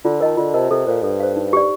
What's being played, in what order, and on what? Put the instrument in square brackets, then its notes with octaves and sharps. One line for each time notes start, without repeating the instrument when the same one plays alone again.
[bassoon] D3 [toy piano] F4
[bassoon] D#3 [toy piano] A#4 D#5 A5
[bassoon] D3 [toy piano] F4
[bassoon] C3 [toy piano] A#4 D#5 A5
[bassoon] C3 [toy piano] A4
[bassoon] A#2 [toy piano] C5 F5
[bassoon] G2 [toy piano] A4
[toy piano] C5 F5
D#4
G4 D5